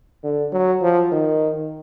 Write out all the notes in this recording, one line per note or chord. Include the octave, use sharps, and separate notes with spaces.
D3
F#3
F3
D#3